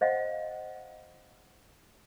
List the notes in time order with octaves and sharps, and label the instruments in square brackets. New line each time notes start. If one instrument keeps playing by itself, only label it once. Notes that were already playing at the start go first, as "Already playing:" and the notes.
[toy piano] C5 D#5 F5 F#5